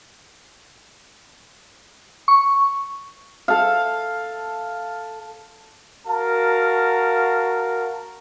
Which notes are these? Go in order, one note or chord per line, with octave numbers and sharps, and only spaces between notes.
C#6
A4 F5
F#4 A#4 F5 A5